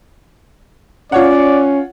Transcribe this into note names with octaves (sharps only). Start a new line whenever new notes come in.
C#4 F4 C#5 D5 F#5